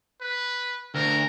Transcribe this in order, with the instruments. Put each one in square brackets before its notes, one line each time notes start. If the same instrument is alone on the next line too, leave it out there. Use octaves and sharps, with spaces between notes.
[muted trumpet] B4
[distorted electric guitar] D2 [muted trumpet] A#4